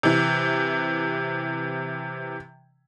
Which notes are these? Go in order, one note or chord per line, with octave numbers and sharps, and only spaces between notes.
C3 E3